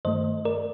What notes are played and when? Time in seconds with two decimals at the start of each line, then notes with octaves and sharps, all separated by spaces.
0.05 G2 D#3 A3 C5 D#5
0.45 A#4 D5